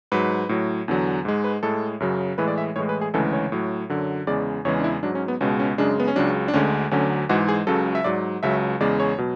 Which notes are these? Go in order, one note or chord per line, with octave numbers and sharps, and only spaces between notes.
G#2 F#3 B4
A2 F#3
E2 D3 F#3
G#2 G#3
B4
A2 G#3 A4
F#2 C#3 F#3
A2 E3 G#3 B4
D5
E5
A2 E3 G#3 C#5
B4
G#4
D2 C#3 E3 G#3 A4
C#5
A2 F#3
F#2 D3 F#3
E2 C#3 G#3 D5
E2 C#3 E3 G#3 C#5
D4
E4
G#2 F#3 D4
C#4
B3
C#2 B2 G#3 C#4
C#4
F#2 C#3 G#3 D4
B3
C#4
C#2 C#3 F#3 D4
D4
D2 D3 G#3 C#4
D2 D3 F#3 C#4
G#2 E3 G#3 F#4
G#4
C#2 C#3 F#3 A4
E5
G#2 F#3 D5
C#2 C#3 F#3 E5
E2 C#3 G#3 D5
C#5
B2 F#3